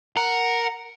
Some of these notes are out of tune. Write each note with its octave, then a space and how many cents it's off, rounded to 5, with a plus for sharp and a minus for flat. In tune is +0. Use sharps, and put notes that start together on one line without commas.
A#4 +0 F#5 +0